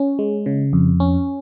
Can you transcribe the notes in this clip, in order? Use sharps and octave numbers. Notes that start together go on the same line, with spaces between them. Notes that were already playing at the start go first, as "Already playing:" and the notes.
Already playing: C#4
G#3
C#3
F2
C#4